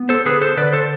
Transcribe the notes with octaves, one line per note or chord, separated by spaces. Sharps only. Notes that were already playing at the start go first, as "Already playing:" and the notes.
Already playing: B3
A4 C5
D3 G#4 B4
A4 C5
D3 B4 D5
A4 C5